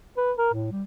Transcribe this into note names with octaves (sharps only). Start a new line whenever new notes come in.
B4
A#4
A2
G3